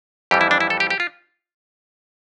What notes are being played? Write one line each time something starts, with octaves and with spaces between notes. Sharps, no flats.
F2 E3 G3 G4
E4
D4
E4
A4
G4
G4
F4